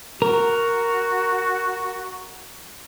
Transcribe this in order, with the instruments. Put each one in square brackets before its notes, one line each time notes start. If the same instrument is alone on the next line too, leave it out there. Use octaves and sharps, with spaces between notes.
[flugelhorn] F#4 [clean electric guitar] A#4